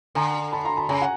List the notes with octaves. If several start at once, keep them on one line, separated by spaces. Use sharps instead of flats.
D3 G#5 A#5
A5 B5
A#5 C6
A5 B5
C#3 G#5 A#5
F#5 G#5